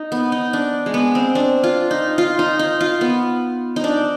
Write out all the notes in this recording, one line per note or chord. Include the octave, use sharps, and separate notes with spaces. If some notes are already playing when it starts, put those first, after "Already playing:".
Already playing: D#4
B3
D#4
D4
G#3
B3
C4
D4
F4
D#4
F4
D#4
D#4
F4
B3
D#4
D4